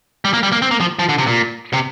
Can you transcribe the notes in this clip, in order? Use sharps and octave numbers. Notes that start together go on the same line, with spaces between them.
G3
A#3
G3
A#3
C4
A#3
F3
F3
D3
C3
A#2
C3